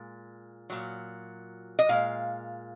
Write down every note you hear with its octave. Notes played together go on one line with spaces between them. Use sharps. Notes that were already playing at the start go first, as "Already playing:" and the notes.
Already playing: A#2 G#3
A#2 F#3
D#5
A#2 G#3 F5